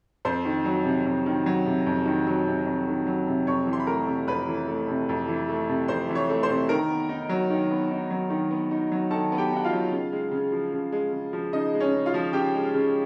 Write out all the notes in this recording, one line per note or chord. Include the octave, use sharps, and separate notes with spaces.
F2 C5 C6
D#3
F#3
C3
F2
D#3
F#3
C3
F2
D#3
F#3
C3
F2
D#3
F#3
C3
F2 C#5 C#6
E3
C6
B5
A3 A#4 A#5
C3
F2 B4 B5
E3
A3
C3
F2
E3
A3
C3
F2 C5 C6
E3
C#5 C#6
A3
C5 C6
C3
D#3 A#4 A#5
B3
D#4
F#3
D#3
B3
D#4
F#3
D#3
B3
D#4
F#3
D#3 A4 A5
B3
G4 G5
D#4 F#5
F4 F5
F#3
C#3
G#3
C#3
F3
C#3
G#3
C#3
F3
C#3 D#4 D#5
G#3
C#4 C#5
C#3
F4 F5
F3
C#3 G4 G5
G#3
C#3